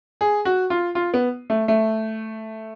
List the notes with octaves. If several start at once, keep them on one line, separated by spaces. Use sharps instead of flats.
G#4
F#4
F4
F4
B3
A3
A3